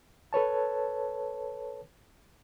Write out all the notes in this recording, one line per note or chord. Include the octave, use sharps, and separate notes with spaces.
A4 B4 C#5 A5